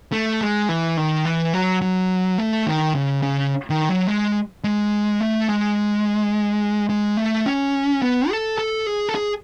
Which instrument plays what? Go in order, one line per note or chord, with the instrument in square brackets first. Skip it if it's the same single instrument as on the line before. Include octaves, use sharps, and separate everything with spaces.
[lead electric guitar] A3
G#3
E3
D#3
E3
F#3
F#3
A3
D#3
C#3
C#3
D#3
F#3
G#3
G#3
A3
G#3
G#3
A3
C#4
B3
A4
A4
G#4
A4
G#4